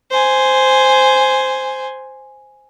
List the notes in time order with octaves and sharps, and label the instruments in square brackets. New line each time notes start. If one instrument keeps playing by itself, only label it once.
[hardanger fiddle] C5 G#5